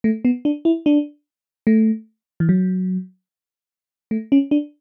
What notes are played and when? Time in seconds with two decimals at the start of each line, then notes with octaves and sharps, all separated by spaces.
0.04 A3
0.25 B3
0.45 D4
0.65 E4
0.86 D4
1.67 A3
2.40 E3
2.49 F#3
4.11 A3
4.32 C#4
4.51 D4